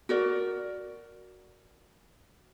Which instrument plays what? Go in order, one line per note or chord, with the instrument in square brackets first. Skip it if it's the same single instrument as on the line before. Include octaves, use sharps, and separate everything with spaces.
[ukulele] F#4 A#4 D5